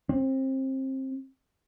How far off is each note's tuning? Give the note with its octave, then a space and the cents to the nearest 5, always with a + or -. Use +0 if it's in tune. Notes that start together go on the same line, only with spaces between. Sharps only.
C4 +25